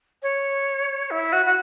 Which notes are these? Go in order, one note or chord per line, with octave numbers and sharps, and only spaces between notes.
C#5
E4
F#4
F#4